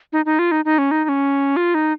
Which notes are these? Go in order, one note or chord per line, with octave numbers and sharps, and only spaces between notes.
D#4
D#4
F4
D#4
D#4
C#4
D#4
D#4
C#4
F4
D#4